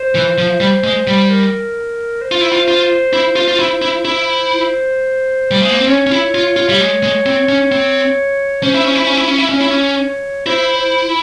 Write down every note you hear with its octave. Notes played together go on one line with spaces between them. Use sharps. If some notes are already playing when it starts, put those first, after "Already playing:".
Already playing: C5
E3
F3
G3
G#3
G3
A#4
C5
F4
E4
F4
F4
E4
F4
F4
E4
E4
E4 C5
G3
G#3
A#3
C4
C#4 C#5
C#4
E4
F4
F4
G3
G#3
G#3
C4
C#4
C4
C#4 C5
E4
C#4
E4
C#4
E4
C#4
E4
C#4
E4 C#5
C#4
E4 C5
C5